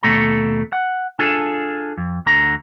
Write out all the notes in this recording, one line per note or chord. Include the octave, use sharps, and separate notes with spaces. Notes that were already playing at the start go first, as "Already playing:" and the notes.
D#2 B2 F#3 A3 A4 A#5
F#5
D4 F4 G#4 A4
F2
D2 D3 A#5